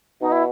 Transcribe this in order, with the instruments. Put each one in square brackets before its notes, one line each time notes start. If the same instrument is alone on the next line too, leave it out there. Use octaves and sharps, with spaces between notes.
[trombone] B2 [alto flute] D#4
[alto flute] E4